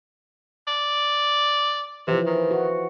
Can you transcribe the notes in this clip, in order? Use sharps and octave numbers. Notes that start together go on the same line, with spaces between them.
D5
C3 E3 F3
D#3
F#4